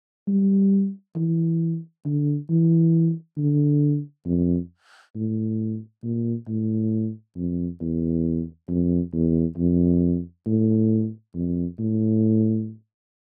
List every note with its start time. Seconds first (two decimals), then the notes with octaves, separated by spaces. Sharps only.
0.28 G3
1.16 E3
2.05 D3
2.50 E3
3.37 D3
4.26 F2
5.15 A2
6.03 A#2
6.47 A2
7.36 F2
7.81 E2
8.69 F2
9.14 E2
9.58 F2
10.46 A2
11.34 F2
11.79 A2